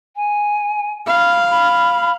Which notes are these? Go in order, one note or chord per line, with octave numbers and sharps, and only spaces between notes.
G#5
F5 B5
B5